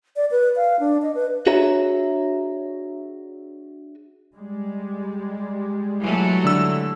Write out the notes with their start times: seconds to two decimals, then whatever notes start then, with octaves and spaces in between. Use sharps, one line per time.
0.16 D5
0.31 B4
0.56 F5
0.80 D4
1.02 D#5
1.15 B4
1.46 D4 F#4 G#4 C#5 E5 A#5
4.35 G3 G#3
6.01 E3 F#3 A3
6.44 D3 E6